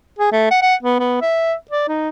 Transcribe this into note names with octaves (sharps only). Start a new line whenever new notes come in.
G#4
A3
F#5
F#5
B3
B3
E5
D5
D#4